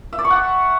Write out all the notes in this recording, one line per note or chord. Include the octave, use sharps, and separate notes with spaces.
E5
D5
C#6
F#5